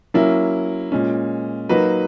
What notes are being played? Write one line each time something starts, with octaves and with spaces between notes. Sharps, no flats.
F#3 A#3 C#4 E4
A#2 G#3 C#4
F#3 A#3 D#4 F#4 B4